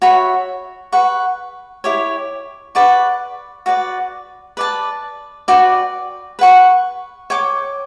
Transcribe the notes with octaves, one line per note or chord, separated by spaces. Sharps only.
F#4 C#5 E5 B5
B4 F#5 C#6
E4 G4 C#5
B4 D5 F#5 C#6
F#4 B4 D5
B4 D5 A5
F#4 B4 D5 G5
B4 F#5 C#6
C#5 G5 D6